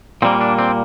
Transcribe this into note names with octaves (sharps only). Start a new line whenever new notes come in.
A#2 G3 A#3 C4
D4
C4